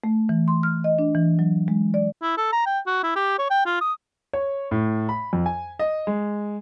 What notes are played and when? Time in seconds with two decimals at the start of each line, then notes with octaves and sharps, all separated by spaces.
0.04 A3
0.29 E3
0.48 C6
0.63 F6
0.84 D#5
0.99 D4
1.15 E3
1.39 F#3
1.68 G#3
1.94 D5
2.22 E4
2.38 A4
2.52 A#5
2.66 G5
2.87 F#4
3.03 E4
3.16 G4
3.38 C#5
3.51 G5
3.66 F4
3.81 D#6
4.33 C#5
4.71 A2
5.09 B5
5.33 F2
5.46 G#5
5.79 D#5
6.07 G#3